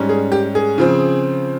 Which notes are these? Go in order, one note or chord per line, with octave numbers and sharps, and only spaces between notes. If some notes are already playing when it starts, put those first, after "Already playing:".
Already playing: G#2 G3 C#4
G#4
G4
G#4
C#3 F3 C4